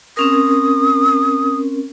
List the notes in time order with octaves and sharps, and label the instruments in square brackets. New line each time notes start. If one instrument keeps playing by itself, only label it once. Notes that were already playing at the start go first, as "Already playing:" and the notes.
[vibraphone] C4 C#4 A#4 [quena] D#6